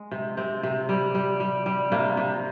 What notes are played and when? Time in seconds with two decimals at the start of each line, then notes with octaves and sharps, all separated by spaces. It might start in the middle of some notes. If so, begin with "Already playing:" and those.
Already playing: G#3
0.11 C3
0.37 C3 C4
0.63 C3
0.89 G3
1.15 G3
1.40 G3
1.66 G3
1.92 C3 A#3
2.17 C3